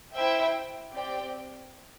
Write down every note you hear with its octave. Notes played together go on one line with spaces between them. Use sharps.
E4 C5 E5 G5
C4 G4 D5 G5